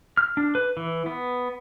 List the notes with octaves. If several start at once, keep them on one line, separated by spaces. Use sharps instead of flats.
F6
D4
B4
E3
B3